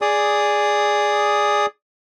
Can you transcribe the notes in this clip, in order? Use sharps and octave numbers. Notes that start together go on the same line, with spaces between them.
G#4 D5 D#6